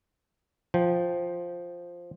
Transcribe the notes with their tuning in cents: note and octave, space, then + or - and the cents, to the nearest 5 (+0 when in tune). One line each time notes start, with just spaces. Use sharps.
F3 +0 G5 +0